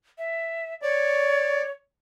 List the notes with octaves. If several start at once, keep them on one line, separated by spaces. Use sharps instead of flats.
E5
C#5 D5